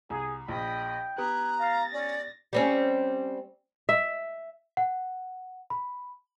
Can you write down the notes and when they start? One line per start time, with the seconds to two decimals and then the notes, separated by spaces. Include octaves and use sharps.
0.10 C2 G#4
0.48 A#1 D#5 G5 B5
1.18 B3 G4 A#5 D#6 F#6 G#6
1.60 F5 A6 A#6
1.93 C#4 D5
2.53 G3 C4 C#4
3.89 E5
4.77 F#5
5.70 B5